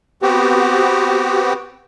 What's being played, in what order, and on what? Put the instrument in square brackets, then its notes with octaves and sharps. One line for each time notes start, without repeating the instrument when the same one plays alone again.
[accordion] B3 C4 F#4 G4